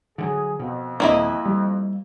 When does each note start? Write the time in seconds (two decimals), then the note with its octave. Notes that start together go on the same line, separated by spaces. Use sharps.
0.18 D3 E3 F#3 G#4
0.59 F2 B2
1.00 D#1 A#3 C4 E4 D#5
1.46 G3